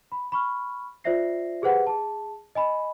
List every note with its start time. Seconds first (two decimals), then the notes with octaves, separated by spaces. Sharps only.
0.12 B5
0.32 B5 C#6 F6
1.04 F4 C5 D5 E5 A#6 C7
1.62 G4 G#4 B4 C5 F#5
1.87 G#4 A5
2.55 D#5 G#5 B5